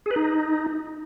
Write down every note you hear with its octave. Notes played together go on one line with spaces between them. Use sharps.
G#4
B4
D#4